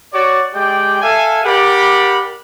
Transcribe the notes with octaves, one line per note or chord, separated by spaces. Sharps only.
F#4 C#5 D5
G#3 G4 D5 G5
A4 E5 F5 G#5
G4 A#4 D5 F#5 B5